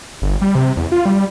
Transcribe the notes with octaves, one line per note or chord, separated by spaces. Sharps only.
G1
G3
C3
E2
F4
G3